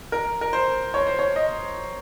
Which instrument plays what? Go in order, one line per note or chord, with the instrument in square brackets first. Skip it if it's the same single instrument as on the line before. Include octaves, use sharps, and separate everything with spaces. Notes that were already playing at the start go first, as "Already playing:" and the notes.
[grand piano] A#4
A#4
C5
C#5
C5
C#5
D#5